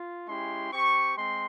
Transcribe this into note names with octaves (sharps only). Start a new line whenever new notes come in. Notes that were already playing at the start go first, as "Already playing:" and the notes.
Already playing: F4
G#3 C#4 E4 G4 C6
C4 G4 C#6
G#3 C4 C6